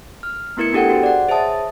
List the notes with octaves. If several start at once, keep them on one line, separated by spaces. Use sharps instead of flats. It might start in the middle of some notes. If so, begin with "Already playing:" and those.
F6
A3 B3 E4 A#4 G#6 C#7
B3 D4 G4 A4 F#5 G5
F#4 G#4 C5
D5 F#5
G#4 C5 C#5 E5 A5 D#6